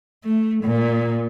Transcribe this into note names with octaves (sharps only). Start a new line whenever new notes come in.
A3
A#2